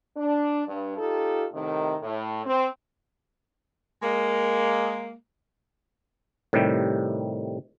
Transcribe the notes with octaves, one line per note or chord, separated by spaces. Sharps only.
D4
G2
D#4 F4 G4 A4
A2 C3 D#3
A2
C4
G#3 A#3
A2 C3 D#3 G3